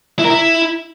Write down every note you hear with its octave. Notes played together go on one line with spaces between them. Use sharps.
E4
A#4
E4